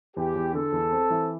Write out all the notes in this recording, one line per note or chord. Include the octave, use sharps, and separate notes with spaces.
E2 G4
E2
D3 A4
E2
C4
E3